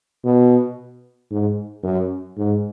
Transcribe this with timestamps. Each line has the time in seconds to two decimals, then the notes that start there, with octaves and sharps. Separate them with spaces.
0.24 B2
1.31 G#2
1.83 F#2
2.38 G#2